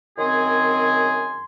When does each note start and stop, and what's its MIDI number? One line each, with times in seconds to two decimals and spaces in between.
0.19 1.45 42
0.19 1.45 51
0.19 1.45 60
0.19 1.45 68
0.19 1.45 80
0.19 1.45 84